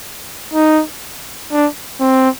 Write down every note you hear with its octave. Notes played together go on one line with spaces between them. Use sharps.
D#4
D4
C4